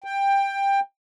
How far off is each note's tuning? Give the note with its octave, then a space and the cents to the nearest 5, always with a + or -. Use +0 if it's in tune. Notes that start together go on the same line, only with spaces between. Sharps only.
G5 +15